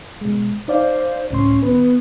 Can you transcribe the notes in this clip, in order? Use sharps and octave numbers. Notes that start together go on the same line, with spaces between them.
B2 G#3
D#4 C5 D5 F5
C#2 A2 C#4 C6
D#3 B3 B4